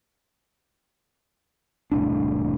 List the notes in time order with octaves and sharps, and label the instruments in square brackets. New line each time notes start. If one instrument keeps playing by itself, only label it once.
[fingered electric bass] E1 C2 A2 D4